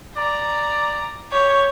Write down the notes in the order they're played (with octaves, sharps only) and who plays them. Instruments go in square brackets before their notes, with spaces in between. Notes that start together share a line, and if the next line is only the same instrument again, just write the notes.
[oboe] D5 [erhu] A#5
[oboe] G4 [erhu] C#5